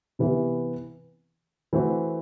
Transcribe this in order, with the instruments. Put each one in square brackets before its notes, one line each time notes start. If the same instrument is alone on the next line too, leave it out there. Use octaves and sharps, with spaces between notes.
[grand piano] C3 E3 B3 E4
E3 A3 C4 F#4